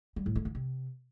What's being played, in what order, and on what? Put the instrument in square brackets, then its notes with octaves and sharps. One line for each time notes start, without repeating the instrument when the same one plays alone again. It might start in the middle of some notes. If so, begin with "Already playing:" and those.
[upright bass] G3
A2
A3
D3
C3